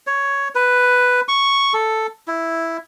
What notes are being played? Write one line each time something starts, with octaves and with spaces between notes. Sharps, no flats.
C#5
B4
C#6
A4
E4